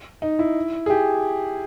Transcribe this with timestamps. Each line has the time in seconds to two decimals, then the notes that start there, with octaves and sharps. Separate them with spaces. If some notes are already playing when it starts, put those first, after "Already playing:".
0.22 D#4
0.39 E4
0.86 G#4
0.90 G4